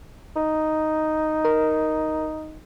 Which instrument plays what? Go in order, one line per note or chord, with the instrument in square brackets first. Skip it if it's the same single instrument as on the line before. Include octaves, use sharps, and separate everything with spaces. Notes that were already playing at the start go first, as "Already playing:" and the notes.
[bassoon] D#4
[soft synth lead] A#4